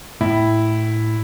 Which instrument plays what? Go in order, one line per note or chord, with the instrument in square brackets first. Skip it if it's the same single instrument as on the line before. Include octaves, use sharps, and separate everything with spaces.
[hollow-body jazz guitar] A2 [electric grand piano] E4